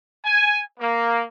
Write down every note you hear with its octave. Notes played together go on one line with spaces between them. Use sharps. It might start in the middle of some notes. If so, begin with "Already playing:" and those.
G#5
A#3